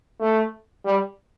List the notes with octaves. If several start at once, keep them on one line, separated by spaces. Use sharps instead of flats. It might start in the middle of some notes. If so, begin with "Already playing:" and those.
A3
G3